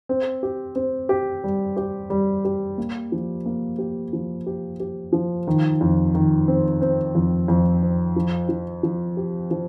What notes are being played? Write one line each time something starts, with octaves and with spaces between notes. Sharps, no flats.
C4
G4
C4
G4
G3
G4
G3
G4
A#3
F3
A#3
G4
F3
G4
G4
F3
D#3
F2
D#3
C4
C4
F2
F2
C4
F3
F3
F3
G4
F3